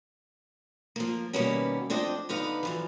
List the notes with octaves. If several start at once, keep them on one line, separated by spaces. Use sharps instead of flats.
F3 A#3
B2 D#3 G3 A#3 B3 C#4
F2 D4 C5 D#5 G5
D3 B3 D#4 F5
F#2 E3 F3